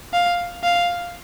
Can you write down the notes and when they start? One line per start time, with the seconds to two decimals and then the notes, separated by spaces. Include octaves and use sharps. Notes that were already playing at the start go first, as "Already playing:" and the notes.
0.13 F5
0.64 F5